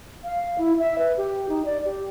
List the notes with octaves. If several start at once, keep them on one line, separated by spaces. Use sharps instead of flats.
F5
E4
E5
B4
G4
D#4
D5
G4